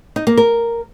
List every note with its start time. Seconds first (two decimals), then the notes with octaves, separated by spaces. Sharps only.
0.16 D#4
0.27 A#3
0.37 A#4